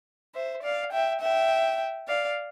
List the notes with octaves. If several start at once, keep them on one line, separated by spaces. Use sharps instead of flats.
C5 E5
D5 F5
E5 G5
E5 G5
D5 F5